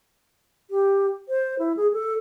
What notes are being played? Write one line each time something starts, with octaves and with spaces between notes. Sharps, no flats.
G4
C5
E4
G#4
A4